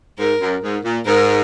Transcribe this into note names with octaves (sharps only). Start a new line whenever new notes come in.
G#2 A#4
F#2
G#2
A#2
G#2 A#4